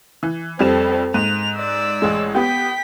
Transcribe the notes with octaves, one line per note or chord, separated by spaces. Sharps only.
E3
F2 G3 C4 A4 E7
G#2 F#6 D#7 F7
D5 E6
A1 G#3
B3 G4 G5 B6